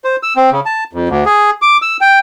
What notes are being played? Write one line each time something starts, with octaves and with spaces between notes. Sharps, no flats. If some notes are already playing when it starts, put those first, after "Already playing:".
C5
E6
C4
C#3
A5
F2
D2
G#4
D6
E6
G5